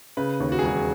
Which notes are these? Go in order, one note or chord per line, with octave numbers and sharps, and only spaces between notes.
C#3 B4
D#2
F#4
G#4
E1 F#4